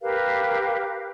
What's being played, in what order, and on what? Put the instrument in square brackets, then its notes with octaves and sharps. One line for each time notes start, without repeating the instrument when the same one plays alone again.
[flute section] G4 A#4 B4 F5